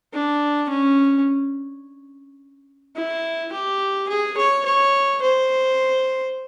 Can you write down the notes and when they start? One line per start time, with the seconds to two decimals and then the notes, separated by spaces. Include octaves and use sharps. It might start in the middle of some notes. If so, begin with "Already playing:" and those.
0.13 D4
0.69 C#4
2.96 E4
3.52 G4
4.09 G#4
4.38 C#5
4.65 C#5
5.22 C5